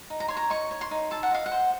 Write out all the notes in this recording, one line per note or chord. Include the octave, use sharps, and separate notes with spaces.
D#4
A#5
C#5 C6
A#5
D#4 C#6
C#5
C6
D#4
A4 A5
F#5
D#5 F5
F#5
C5